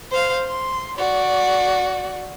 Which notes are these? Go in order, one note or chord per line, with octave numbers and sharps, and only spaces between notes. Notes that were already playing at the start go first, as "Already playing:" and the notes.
C5 F5
C6
F#4 D5